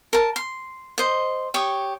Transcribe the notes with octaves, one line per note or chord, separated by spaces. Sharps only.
A#4 A5
C6
C5 D#5
G4 C#5 C#6 D#6